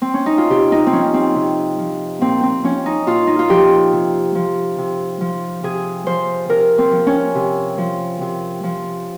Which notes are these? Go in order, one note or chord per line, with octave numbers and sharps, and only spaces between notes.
C4
C#4
D#4
F4
C3 G4
D#4
C4
F3 C#4
C4
C3
F3
A#2 C4
C4
F3 C#4
D#4
A#2 F4
D#4
F4
F3 G4
C3
F3
C3
F3
C3 G#4
F3 C5
C3 A#4
C4
F3
C#4
C3
F3
C3
F3